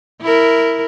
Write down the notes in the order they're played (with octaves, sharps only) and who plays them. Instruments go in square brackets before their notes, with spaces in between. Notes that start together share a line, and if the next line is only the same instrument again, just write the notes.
[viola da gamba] E4 A#4